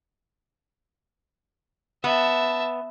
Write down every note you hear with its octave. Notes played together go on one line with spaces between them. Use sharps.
B3 E5 A5